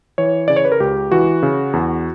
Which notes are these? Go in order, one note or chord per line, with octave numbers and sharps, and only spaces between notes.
E3 C#5
C#3 D5
C#5
B4
A#4
C#2 G4
E3 F#4
C#3
E2